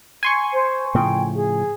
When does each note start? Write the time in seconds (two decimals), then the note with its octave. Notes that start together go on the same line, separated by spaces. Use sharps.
0.23 G#5 C6 C#6
0.53 C5
0.95 A2 C#3 F3 G5
1.35 G#4